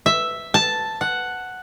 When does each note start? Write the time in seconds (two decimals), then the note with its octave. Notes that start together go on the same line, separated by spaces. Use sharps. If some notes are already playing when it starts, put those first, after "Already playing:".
0.06 E5
0.54 A5
1.01 F#5